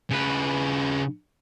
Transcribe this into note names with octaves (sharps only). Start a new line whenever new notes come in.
C#3 B4